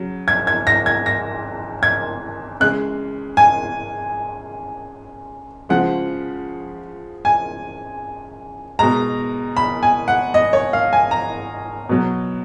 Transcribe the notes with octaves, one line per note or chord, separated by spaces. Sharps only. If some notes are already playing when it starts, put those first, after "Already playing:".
Already playing: C#3 F#3
G#6
G#6
A#6
G#6
A#6
G#6
C#3 G#3 F#6
G#5
C#3 F3 G#3 F#5
G#5
B2 G#3 A#5
B5
G#5
F#5
D#5
C#5
F5
G#5
A#5
B2 F#3